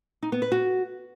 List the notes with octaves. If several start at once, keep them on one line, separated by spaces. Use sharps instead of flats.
D#4
B3
B4
F#4